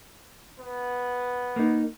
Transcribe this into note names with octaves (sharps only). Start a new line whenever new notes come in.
B3
A#3 D#4